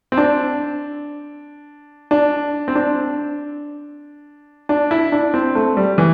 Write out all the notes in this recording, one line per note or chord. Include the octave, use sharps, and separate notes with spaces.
C4
D4
D4
C4
D4
D4
E4
D4
C4
A3
G3
E3